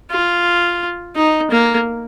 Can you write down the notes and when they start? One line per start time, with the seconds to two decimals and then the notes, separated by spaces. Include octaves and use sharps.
0.11 F4
1.16 D#4
1.51 A#3